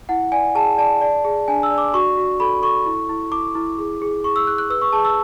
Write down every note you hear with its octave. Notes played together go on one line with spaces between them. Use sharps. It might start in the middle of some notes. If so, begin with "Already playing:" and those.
E4 F#5
D5 G#5
G#4 A5
D5 A5
D5
G#4
D4 G#5
E6
D5
D6
F#4 C#6
F#4
A4 B5
A4 C#6
E4
E4
E4 D6
E4
G#4
G#4
G#4 C#6
E6
G#4 F#6
F#6
B4 E6
C#6
G#4 A5
E6